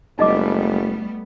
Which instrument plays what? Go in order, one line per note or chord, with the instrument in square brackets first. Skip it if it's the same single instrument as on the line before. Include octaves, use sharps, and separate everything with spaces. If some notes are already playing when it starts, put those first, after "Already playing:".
[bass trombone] F#1 [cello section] G3 A3 B3 [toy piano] D#4 D#5 D6